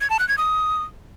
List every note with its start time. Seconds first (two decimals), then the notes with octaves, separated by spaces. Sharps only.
0.01 G#6
0.10 A5
0.19 F#6
0.29 G#6
0.38 D#6